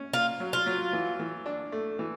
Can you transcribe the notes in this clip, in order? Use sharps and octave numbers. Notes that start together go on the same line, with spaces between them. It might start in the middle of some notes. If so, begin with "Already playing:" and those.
Already playing: C#4
A#3 F4
F#3
F4
F#3
E3
E3
D4
A3
E3